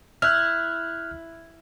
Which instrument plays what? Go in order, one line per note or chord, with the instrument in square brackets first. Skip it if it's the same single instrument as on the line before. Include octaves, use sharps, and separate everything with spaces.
[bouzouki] E4 [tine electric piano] F6 F#6